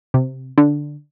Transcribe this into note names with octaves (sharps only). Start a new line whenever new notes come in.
C3
D3